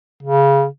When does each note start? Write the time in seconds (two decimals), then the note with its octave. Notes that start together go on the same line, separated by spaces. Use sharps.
0.23 C#3